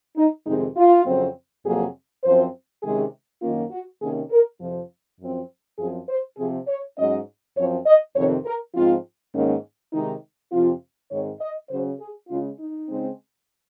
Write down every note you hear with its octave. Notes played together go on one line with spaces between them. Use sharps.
D#4
F2 C3 D#3 G#3 D#4
F4
F2 C#3 F#3 C4
F2 C3 F#3 A#3 G#4
F#2 F3 C4 C5
C3 D#3 G#3 C#4 G#4
F#2 D#3 A#3 C#4 F4
F#4
C3 D#3 A#3 C#4 G#4
A#4
F2 C3 F3
F#2 F3 C4
F#2 F3 C4 G#4
C5
C3 F3 C4 G#4
C#5
G#2 F#3 C#4 D#5
F#2 F3 C4 C#5
D#5
F2 C3 D#3 C#5
A#4
G#2 F3 C4 F4
G#2 D#3 A#3 C#4
C3 D#3 G#3 D#4
F2 C3 F3 C4 F4
G#2 D#3 G#3 C4 C#5
D#5
C#3 F#3 C#4 C5
G#4
C#3 G#3 C#4 F4
D#4
C#3 G#3 C4